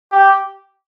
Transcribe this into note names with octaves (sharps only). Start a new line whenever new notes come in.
G4